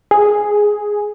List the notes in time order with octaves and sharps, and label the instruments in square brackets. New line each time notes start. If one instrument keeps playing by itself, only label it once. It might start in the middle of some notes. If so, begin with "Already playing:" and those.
[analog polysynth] G#4